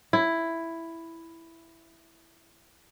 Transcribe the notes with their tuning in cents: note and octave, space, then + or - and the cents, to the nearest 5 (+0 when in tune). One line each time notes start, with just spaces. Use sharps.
E4 +5